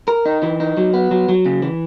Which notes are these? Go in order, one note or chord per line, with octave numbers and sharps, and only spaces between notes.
A#4
D#4
E3
D#4
F#3
B3
F#3
F#3
C#3
E3